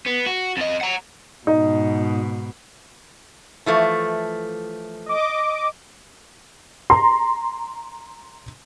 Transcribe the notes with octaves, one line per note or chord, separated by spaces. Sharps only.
B3
F#4
F2 D#5
F#5 A#5
G#2 B2 D#4
E3 F3 A3
D#5 D6
A#5 C6